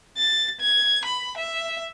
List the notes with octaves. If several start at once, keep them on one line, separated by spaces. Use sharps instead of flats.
A6
G#6
B5
E5